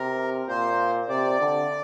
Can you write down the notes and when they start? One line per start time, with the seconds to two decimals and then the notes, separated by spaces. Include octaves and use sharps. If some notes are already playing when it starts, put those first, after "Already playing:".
Already playing: C3 A#4
0.48 A#2 C5
1.09 C3 D5
1.40 D3